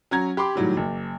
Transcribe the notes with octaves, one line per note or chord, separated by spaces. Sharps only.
F#3 C#4 A#5 G#6
G4 B5 C6 D6
A2 D#3 F#3 G3
F#1